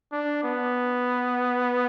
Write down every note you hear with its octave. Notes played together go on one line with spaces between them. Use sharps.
D4
B3